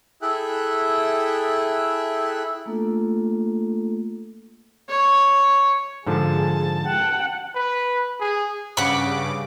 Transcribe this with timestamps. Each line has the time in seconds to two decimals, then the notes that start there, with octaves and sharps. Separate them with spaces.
0.22 E4 G#4 A4 E5 G5 F#6
2.66 A3 A#3 D4 F4 A4
4.89 C#5
6.07 G#2 D3 F3 G#4 A5
6.86 F#5 G5
7.55 B4
8.20 G#4
8.77 G2 C#3 F#5 B5 D6